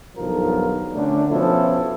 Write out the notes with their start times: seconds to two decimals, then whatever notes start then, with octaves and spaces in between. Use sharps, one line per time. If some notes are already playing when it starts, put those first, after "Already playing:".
0.16 B1 G2 D#3 F3 A#4
0.94 D3 A3 C#4 D4
1.29 B2 F3 C#4 E4 A4